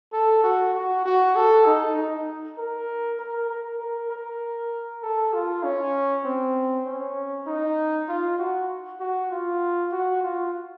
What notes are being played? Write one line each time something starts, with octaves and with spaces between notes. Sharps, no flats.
A4
F#4
F#4
F#4
A4
D#4
D#4
A#4
A#4
A#4
A#4
A#4
A4
F4
C#4
C4
C#4
D#4
F4
F#4
F#4
F4
F#4
F4